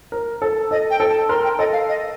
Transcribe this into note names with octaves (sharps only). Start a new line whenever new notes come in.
A#4
A4
A4 D#5
G5
A4
A5
A#4 C6
G5
A4 D#5
F5
D#5